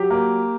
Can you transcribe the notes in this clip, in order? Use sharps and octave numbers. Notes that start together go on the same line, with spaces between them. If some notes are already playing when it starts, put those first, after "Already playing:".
Already playing: F#3 G4
A#3